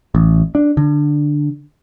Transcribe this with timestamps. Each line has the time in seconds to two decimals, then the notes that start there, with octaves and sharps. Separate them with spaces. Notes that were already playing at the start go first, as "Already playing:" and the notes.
0.15 A1
0.55 D4
0.77 D3